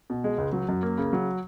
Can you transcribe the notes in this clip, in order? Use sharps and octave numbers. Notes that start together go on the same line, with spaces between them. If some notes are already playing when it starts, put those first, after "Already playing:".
B2
G#3
C#2
F#3
F#2
A#3
C#3
F#3